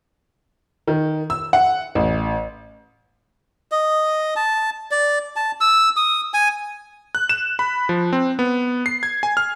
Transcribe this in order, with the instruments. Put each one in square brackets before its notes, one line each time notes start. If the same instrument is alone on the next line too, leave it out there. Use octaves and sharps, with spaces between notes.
[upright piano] D#3
E6
F#5
A1
[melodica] D#5
A5
D5
A5
E6
D#6
G#5
[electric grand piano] F#6
E7
B5
F3
C4
B3
C7
G#6
G#5
F6